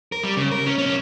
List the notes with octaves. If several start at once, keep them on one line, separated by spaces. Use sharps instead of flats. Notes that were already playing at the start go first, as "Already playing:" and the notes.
A#4
G3
C#3
A#4
C#4
B1 C#4